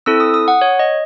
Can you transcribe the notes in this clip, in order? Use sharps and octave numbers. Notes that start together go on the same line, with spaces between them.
C4 E4 A4 E6
D#6
D#6
F#5
C#5
D#5